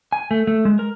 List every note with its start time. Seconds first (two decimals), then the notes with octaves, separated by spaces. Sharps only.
0.12 G#5
0.31 A3
0.47 A3
0.65 G#3
0.79 A#4